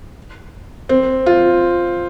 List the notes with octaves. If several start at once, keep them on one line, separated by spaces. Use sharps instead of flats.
C4
F4